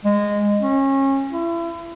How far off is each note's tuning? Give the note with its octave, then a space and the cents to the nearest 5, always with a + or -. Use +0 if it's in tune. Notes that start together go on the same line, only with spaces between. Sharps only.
G#3 -15
C#4 -30
E4 +35